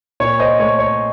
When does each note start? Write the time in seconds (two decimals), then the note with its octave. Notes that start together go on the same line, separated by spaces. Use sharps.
0.20 A#2 C#5
0.39 C5 D#5
0.59 A3 C#5
0.79 C#5